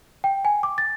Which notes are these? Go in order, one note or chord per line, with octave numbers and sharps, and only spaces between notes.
G5
G#5
D6
A6